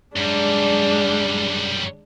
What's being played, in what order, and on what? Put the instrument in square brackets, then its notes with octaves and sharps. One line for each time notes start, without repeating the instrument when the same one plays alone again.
[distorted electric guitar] F#2 G3 [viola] G#3 D4